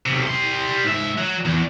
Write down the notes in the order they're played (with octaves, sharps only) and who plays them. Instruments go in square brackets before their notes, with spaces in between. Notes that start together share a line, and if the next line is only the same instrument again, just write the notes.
[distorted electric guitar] B1 C3
G3 C6
G#2 E5
F#3
E2